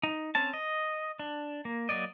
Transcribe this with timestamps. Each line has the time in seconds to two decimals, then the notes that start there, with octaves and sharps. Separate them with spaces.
0.03 D#4
0.35 C4 C#4 A5
0.54 D#5
1.19 D4
1.65 A#3
1.89 F#3 A#3 D5 D#5